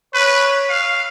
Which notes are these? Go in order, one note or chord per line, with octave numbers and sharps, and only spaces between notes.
B4 C#5
F5